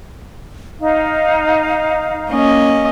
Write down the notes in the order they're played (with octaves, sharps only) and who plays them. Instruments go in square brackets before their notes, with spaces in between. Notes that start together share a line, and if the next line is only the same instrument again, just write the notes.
[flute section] D#4 F5
[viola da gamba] A#3 C#4 D#5